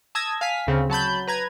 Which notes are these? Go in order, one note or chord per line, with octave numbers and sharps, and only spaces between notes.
A5 D#6 E6 G#6 A#6
F5 G#5 B6
D2 C#3 C4
F#3 A5 B5 G6
B4 A#5 G#6